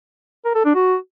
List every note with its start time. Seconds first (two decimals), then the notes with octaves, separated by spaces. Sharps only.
0.45 A#4
0.55 A4
0.65 D4
0.75 F#4